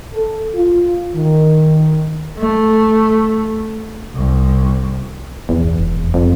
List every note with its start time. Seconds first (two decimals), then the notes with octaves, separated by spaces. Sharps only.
0.13 A4
0.54 F4
1.15 D#3
2.38 A3
4.15 C2
5.49 E2 B2
5.62 G2 B2
5.78 E1
6.14 F2